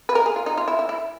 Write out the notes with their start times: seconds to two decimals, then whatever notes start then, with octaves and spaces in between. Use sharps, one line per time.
0.09 B4
0.15 A#4
0.26 G#4
0.36 F4
0.46 D#4
0.58 F4
0.68 E4
0.79 E4
0.89 E4